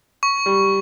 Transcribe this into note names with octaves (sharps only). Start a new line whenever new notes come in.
C#6
G3